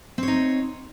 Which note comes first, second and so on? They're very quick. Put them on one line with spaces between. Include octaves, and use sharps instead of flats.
C4 C#5 D#4